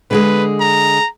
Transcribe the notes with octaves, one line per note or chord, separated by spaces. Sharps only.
D3 G#3 G#4 B4
A#5